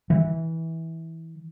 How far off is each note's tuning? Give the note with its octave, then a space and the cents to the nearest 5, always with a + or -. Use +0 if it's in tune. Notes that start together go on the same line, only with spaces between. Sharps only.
E3 -20